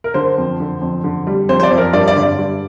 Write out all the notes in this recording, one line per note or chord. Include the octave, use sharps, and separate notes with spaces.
A#4
D3 C5
F2
D3
F2
D3
G3
F2 C5
C5
D5
F2
A#4
G2 D5
D5
D3
D5
G2